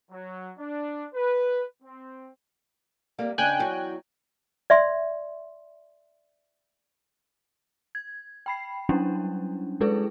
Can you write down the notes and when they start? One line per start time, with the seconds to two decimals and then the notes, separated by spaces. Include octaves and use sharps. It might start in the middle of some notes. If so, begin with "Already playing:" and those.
0.11 F#3
0.58 D4
1.14 B4
1.83 C4
3.19 C3 G3 A#3
3.38 G#2 C#3 D4 G5 G#5 F#6
3.59 E2 F#3
4.70 D5 E5 C6
7.95 G#6
8.46 G5 B5 C7
8.89 F#3 G3 C#4 D4 E4
9.81 G#3 E4 G#4 A4 B4